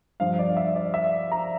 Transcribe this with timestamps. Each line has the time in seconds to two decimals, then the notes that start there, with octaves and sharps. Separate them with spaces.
0.20 G2 F3 F5
0.39 D5
0.57 E5
0.76 D5
0.94 E5
1.32 A#5